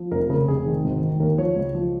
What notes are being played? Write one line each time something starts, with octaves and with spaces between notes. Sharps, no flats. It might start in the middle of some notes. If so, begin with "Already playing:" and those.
Already playing: F3
F1 A#4
C#3 A#4
F1 G#4
D#3
G#1
D#3
D#2 A#4
F3 C#5
C#2
F3